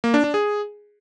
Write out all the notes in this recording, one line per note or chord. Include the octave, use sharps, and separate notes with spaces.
A#3
D4
D4
G#4